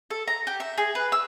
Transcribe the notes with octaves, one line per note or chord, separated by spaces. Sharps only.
A4
A#5
G4
E5
G#4
B4
E6